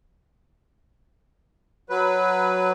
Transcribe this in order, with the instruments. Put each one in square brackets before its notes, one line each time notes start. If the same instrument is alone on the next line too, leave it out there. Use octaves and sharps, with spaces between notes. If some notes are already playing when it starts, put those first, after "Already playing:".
[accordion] F#3 B4